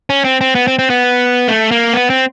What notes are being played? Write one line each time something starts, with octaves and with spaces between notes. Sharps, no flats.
C#4
C4
C4
B3
C4
C4
B3
A3
A#3
B3
C4